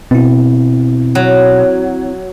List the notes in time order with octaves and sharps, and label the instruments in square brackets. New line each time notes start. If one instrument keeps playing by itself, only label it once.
[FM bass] B2 [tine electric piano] C4 E4
[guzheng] F#3